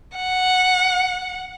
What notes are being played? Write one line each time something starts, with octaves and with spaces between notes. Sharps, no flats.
F#5